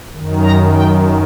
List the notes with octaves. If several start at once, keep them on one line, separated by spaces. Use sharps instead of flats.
F#2 D#3
A#5
G5